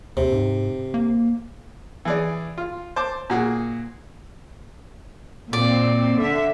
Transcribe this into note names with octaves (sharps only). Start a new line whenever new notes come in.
D#2 C3
G#2
A#3
E3 G#4 D5
F4
C5 A5 D6
A#2 F#4 G#4
A#2 C4 D5
D3 E5